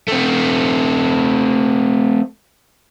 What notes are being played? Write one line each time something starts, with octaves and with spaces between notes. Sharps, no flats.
A3 C4